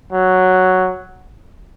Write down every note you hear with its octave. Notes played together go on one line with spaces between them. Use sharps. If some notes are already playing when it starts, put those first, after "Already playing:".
F#3